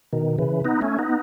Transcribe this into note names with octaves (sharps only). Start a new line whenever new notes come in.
B2 D#3
C#3 E3
B3 D#4
A3 C#4
B3 D#4